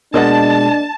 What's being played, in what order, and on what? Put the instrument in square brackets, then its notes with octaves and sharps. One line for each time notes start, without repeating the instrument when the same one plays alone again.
[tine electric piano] B2 G#3 [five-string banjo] A#3 D#5 F#5 [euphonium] D4 [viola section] A5